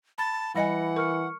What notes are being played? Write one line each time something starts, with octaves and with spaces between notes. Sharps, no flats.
A5 B5 A6
E3 G3 D#5 F#5 G#5 B5 A#6 C#7
A#4 C#6 F6 C#7